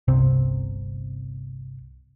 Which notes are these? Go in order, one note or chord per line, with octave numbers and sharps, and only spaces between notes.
G1 C2 C3 C4